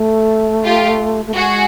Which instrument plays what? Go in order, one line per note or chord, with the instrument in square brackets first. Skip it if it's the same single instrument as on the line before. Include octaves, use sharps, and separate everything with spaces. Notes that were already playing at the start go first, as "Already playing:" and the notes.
Already playing: [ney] A3
[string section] F4 G4
[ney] A3
[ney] G#3 [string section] F#4 G#4